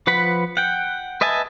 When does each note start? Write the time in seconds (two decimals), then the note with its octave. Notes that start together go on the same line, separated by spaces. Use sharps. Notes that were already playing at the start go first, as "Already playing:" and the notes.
0.07 F3 B4 F#5 B5
0.57 F#5 G5
1.21 B4 D#5 E5 G#5 A5